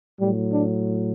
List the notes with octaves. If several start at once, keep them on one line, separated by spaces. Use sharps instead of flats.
A2 F#3 G3
D4